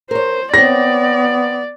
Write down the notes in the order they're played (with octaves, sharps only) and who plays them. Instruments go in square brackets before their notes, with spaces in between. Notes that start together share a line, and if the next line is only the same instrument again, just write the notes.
[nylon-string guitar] A#4 C#5 [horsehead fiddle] C5
[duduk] B3 [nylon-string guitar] C4 C#5 [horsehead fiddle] D5 [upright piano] A#6